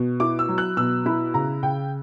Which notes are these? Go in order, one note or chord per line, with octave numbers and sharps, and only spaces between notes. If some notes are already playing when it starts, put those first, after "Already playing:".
Already playing: B2
E4 D6
E6
F#3
F#6
B2 E6
E4 B5
C#3 A#5
C#3 G5